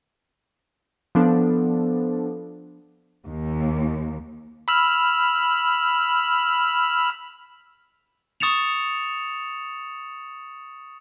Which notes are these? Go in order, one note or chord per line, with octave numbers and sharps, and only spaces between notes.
F3 B3 D4 A4
D#2
B5 E6 F6
C#6 D#6 A6 C#7 E7 F7